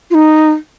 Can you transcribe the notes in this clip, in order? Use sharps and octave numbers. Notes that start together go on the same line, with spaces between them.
F4
D#4